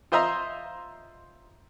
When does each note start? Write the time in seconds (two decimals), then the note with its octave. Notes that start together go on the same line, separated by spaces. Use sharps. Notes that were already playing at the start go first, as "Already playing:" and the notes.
0.12 F4 C5 D#5 E5 A#5 C6